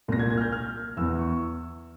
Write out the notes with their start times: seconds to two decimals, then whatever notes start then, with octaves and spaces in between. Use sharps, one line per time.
0.08 C2 A#2 A#6
0.19 G#6
0.30 G#6
0.37 F6
0.42 G6
0.52 F6
0.97 E2 E3 E6
1.19 C#6